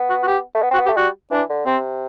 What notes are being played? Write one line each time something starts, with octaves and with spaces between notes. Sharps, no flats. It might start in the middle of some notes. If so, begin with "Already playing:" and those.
Already playing: B3
F#4
F#4
G4
A3
B3
C4
F#4
B3
A3 G4
G3 F#4
E3 D4
D3
C3 C4